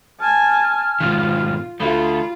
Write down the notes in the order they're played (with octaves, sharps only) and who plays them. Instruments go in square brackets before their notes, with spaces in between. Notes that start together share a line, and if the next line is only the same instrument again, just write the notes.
[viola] G#5 A5 [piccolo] F6
[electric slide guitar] G#2 B2 D#3 [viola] F4
[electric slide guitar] D3 A3 [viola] F4 [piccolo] B5